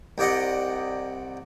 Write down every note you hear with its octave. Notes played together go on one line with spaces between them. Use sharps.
C2 C3 D5 D#5 F#5